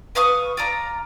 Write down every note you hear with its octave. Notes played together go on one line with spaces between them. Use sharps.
B4 F5 C#6 D#6
F4 D5 A#5